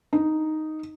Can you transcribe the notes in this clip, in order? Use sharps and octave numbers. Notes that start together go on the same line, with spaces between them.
D#4